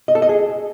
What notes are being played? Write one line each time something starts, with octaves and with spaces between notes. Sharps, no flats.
D#5
A4
D#5
G#4